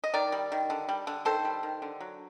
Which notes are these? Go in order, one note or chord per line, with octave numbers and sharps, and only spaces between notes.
D#5
D#3 A#4 D5
G3
D#3
D3
G3
D3
D#3 A4 C5
G3
D#3
D3
F#3